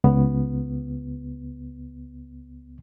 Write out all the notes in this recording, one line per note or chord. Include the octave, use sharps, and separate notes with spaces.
C#2 B3